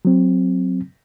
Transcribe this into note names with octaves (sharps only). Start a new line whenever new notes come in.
F#3 C4